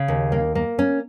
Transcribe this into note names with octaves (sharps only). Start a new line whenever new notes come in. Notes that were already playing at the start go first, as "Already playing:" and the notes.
Already playing: C#3
D#2
A#3
A#3
C#4